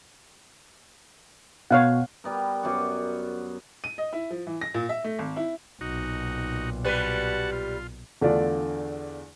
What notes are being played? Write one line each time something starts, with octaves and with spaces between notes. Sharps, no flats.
B2 C#5 F5 F#5
G3 B3 A#4
F#2 B3 D5 F#5
D#7
D#5
E4
F3
E3
A#6
A#2
E5
A3
G#1
E4
B1 A#2 D#4 F#4
G3 F#4 B4 F#5 A5
F4
E2 D3 A3 D4 F4 D5